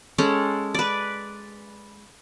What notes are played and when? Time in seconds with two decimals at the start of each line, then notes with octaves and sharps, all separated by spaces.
0.18 G#3 C#4 A4
0.74 B4 D5